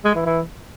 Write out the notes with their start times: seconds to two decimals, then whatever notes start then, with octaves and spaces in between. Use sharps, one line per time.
0.05 G#3
0.15 E3
0.26 E3